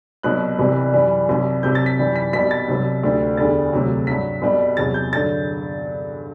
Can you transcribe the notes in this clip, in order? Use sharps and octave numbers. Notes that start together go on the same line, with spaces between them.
C2 B2 F#3 F#6
C2 C3 E3 G3
F#2 E3 G3
C2 C3 F#3
C2 C3 F#3 G6
A6
B6
F#2 E3 G3
B6
C2 B2 G3 B6
A6
C2 C3 F#3
D2 D3 G3
E2 D3 G3 A6
D2 C3 F#3
G2 F#3 B6
C2 B2 G3
E2 C3 F#3 A6
G6
G2 D3 F#3 A6